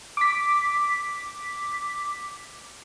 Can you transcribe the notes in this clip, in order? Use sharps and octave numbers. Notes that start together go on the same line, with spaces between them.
D6 B6